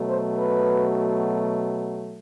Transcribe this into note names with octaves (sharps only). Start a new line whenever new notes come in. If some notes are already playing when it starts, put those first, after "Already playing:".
Already playing: B2 F#3 A3
C5
B4